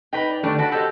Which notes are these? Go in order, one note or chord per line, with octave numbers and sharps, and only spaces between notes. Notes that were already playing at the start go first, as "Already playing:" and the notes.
D#4 B4 G5 B5
D5
D3 D#3 G3 A3 D4 D5
F#4 A4 D5 F#5 A5 B5
F#4 G4 A4 C5 D#5 G6